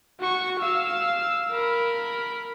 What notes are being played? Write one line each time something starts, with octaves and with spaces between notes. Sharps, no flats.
F#4 C#6
F5 E6
A#4 B5